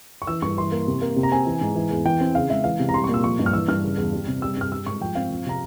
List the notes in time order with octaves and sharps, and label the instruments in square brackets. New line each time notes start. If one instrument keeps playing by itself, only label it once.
[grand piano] C#6
E3 E6
G2 C#6
E3 C6
A#3
C3
A#3
C3
A#5
C4 G#5
E3
G#2
E3
E2
E3 G5
C4
C#3 F5
G#3 E5
E3 F5
C3
A#5
G3 C6
C#6
A#2
E6
F3 C#6
G2
F6
E3 E6
G2 F6
C#3
E2
G3
C3
G3 E6
G2 F6
G3 E6
G#2 C#6
F3 G5
C4 F5
F3
C3 A#5